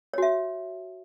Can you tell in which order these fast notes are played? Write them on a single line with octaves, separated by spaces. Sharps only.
C#5 F#4 E5